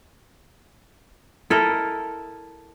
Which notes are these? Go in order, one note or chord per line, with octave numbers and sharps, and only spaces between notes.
E4 A4 A#4 D#5